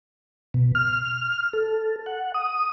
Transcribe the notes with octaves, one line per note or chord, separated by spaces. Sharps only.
B2
F6
A4
F#5
D#6